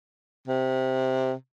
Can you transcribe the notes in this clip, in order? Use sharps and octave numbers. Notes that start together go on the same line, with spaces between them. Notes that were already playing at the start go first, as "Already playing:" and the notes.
C3